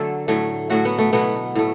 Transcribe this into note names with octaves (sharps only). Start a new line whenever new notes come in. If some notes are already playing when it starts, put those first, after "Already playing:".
Already playing: D3 F#3 A3 A4
A2 F#3 A3
A2 F#3 A3 F#4
B3
A3
B2 F#3 A3 B3
A2 A3